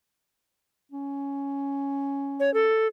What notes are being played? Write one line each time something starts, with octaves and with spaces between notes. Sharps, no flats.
C#4
C#5
A4